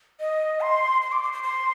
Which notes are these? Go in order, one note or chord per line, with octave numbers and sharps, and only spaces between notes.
D#5
C6
C6
D6
C6
C6
C6